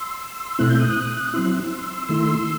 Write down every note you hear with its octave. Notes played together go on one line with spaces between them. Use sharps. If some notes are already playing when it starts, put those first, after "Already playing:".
Already playing: C6 E6
B2 A3 C4 E4 F#6
G6
D#6 F#6
D#6
F#3 C4 E4 C6 E6
D#3 A3 E4 C6 E6